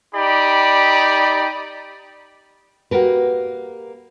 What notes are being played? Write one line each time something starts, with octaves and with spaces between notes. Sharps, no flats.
D#4 G4 D5 B5
A#3 F#4 G4 A#4 B4